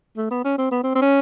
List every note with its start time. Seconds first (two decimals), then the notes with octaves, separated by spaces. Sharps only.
0.17 A3
0.31 B3
0.44 C#4
0.58 C4
0.71 B3
0.84 C4
0.95 C4
1.02 C#4